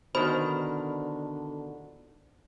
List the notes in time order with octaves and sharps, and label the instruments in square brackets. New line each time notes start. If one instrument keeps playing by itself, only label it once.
[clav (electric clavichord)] B2 D#3 [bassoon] D3 [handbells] C5 B5